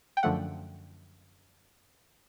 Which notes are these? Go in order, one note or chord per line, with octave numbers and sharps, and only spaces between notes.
G5
F#2 D3 F3 A3 F#5